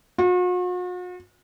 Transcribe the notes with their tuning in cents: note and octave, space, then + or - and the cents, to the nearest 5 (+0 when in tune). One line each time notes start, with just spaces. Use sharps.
F#4 -45